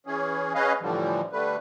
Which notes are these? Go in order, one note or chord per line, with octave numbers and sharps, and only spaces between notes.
E3 C#4 G#4
C#4 G#4 B4 D#5 F5
A2 D3 E3 F3 G3
D3 G3 A3 B4